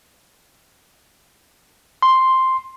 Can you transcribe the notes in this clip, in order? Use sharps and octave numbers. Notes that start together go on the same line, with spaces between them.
C6